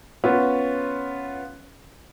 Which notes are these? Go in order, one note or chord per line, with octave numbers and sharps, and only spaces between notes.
B3 C#4 F4